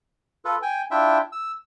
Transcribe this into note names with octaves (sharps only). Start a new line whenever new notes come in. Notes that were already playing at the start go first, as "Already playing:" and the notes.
F4 A4 B4
G5 G#5
D4 E4 F4 E5 G5
E6